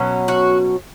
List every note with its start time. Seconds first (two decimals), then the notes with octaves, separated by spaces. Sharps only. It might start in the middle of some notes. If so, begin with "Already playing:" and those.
Already playing: B2 F#3 C#4
0.28 F#4